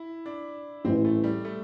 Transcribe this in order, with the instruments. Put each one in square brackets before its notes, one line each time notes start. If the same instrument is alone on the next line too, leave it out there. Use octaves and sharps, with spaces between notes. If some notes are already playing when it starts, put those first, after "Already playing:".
Already playing: [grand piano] E4
D4
[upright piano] A1 A2 E3 [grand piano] C4
[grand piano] A3
G3
A3